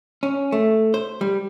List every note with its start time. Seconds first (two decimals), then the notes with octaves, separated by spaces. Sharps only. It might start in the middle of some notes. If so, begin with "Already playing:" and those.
0.23 C#4
0.52 A3
0.94 C5
1.21 G3